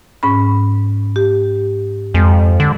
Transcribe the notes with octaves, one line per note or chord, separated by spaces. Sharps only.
G#2 C#4 B5
G4
F2 G#3
D3